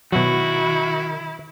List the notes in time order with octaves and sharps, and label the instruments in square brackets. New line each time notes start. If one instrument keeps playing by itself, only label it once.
[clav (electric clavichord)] B2 F#3 [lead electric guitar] D#3 [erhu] E4 [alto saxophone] F#4